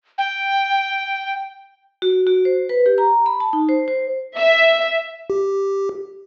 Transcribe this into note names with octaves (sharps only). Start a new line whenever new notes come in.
G5
F#4
F#4
C5
B4
G4
A#5
B5
A5
D#4
C5
C5
E5
G4